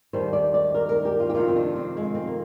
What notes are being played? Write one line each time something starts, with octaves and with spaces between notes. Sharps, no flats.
D#2 D#3 G3 C5
D5
D5
A#4
A#4
G4
F4
G4
F2 C3 D#3 F4
C4
D4
C4
G#3
C4
A#3